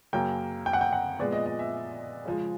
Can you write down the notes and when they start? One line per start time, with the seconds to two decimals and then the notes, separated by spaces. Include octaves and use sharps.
0.13 F#2 C#3 F#3 A#3 G5
0.66 G5
0.73 F#5
0.81 G5
0.93 F#5
1.19 A#2 F3 G#3 B3 D5
1.33 D#5
1.46 D#5
1.59 E5
2.25 C#3 F3 G#3